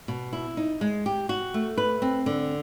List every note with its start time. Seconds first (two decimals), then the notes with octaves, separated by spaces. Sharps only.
0.08 B2
0.33 E4
0.57 D#4
0.81 G#3
1.06 G4
1.29 F#4
1.54 A3
1.77 B4
2.02 C4
2.26 D3